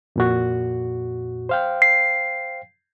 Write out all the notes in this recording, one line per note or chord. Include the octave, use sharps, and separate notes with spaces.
F2 A#2 F#4
C5 F5 G5
C7